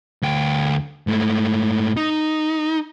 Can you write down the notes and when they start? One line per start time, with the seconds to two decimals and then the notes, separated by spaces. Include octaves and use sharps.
0.22 D2 G5
1.07 G#2 A3
1.97 D#4